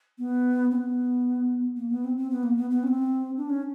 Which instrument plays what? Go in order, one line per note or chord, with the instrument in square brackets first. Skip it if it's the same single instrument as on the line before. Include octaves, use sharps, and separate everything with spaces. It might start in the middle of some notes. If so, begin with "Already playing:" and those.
[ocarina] B3
C4
B3
A#3
B3
C4
C4
B3
A#3
B3
B3
C#4
C4
D4
C#4